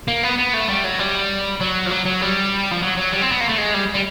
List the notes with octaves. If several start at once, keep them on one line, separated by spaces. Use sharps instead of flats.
A#3
B3
B3
A3
G3
F#3
G3
F#3
F3
F#3
F#3
G3
F3
F#3
F#3
G3
C4
B3
A#3
A3
G#3
G3
G3